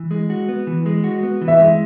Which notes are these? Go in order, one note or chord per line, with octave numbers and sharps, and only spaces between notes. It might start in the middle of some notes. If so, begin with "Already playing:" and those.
Already playing: E3
G#3
F#4
B3
E3
G#3
F#4
B3
E3
E5
G#3